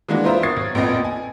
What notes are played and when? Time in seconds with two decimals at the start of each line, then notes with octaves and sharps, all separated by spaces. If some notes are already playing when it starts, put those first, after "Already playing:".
0.08 E3 G#3 A#3 D4 F#4
0.24 B3 F4 A#4 C5 E5 A#5
0.43 C#6 D#6 G#6 A6 C7
0.57 B1
0.75 A#1 F2 B3 D#5
1.04 G#5